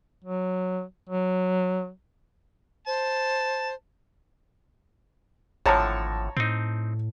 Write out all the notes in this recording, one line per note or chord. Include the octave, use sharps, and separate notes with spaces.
F#3
F#3
C5 A5
G#1 A2 D3 F3 C#5 A5 A#5
A2 C4 D#4